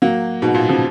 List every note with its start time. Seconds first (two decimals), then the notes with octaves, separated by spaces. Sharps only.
0.02 F#3 A#3
0.42 G#2 B2
0.54 A#2
0.68 C#3 F3